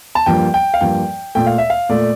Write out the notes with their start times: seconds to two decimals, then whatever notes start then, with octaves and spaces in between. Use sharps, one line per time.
0.15 A5
0.26 G2 F3 A#3 G5
0.54 G5
0.74 F5
0.81 G2 F3 A#3 G5
1.35 A#2 A3 G5
1.47 F5
1.58 E5
1.70 F5
1.89 A#2 A3 D5